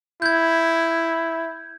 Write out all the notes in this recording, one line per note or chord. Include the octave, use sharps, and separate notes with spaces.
E4 G6 G#6